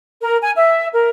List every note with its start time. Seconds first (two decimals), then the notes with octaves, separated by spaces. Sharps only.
0.21 A#4
0.40 G#5
0.56 E5
0.93 A#4